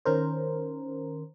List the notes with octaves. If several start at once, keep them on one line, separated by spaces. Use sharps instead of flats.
D#3 C#4 A#4 C5